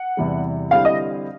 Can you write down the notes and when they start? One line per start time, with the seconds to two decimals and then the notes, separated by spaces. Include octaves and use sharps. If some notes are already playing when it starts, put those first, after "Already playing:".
Already playing: F#5
0.17 E2 C3 E3 G3
0.71 D3 G3 C4 E4 G4 F5
0.85 D#5